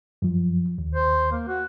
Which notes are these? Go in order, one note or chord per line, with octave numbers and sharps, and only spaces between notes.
F#2 F3
D#2
C5
A#3
F#4